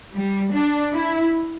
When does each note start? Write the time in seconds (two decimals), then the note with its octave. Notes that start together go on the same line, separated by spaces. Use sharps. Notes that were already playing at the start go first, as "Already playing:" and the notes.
0.15 G3
0.53 D4
0.93 E4